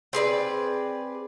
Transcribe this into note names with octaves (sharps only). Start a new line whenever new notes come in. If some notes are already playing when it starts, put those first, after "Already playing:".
C4 G#4 B4 D5